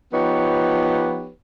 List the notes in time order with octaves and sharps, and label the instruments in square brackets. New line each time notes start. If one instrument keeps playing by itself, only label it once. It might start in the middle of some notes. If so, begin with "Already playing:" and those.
[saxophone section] F3 B3 D#4 G4 B4 C#5